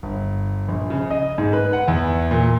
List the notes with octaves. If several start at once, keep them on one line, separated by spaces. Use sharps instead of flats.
G1
A#1
C#3
D#5
G#2
B4
F#5
E2
A#2